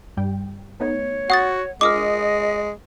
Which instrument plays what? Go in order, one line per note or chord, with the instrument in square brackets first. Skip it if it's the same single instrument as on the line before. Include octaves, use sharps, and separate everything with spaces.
[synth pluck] G2 G3 G5
[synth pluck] A3 B3 D#4 [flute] C#5
[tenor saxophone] F#4 [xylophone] F#5 D#6 A6
[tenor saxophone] G#3 [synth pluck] D4 F4 A#4 [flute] D#5 [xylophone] D6 D#6 F6